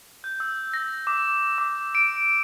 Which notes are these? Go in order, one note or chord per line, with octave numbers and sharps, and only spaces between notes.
G6
E6
A#6
D6
D6
D7